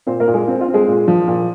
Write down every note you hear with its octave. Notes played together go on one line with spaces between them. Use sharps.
A#2 C4 C5
A#3 A#4
A#2
G#3 G#4
C4 F4
F4
C4
G#3 G#4
A#2
F3
A#2